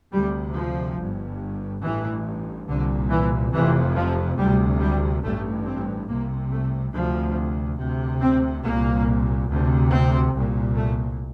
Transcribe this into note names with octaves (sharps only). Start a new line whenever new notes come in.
D2 C3 G3
F3
G1 G2
A1 G2 E3
C2 A#2 D3
E3
F1 F2 C3 E3
F3
D2 C3 G3
G3
A1 G2 A3
C4
C2 C3 A#3
A3
D2 C3 F3
D2 C3
C4
C2 A#2 A#3
D2 C3
C4
C2 A#2
A3